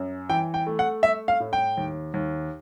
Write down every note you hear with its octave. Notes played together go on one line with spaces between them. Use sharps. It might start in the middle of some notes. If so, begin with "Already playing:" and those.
Already playing: F#2
E3 G5
G5
A3
F#5
A3 E5
F5
A2
G5
D#2
D#2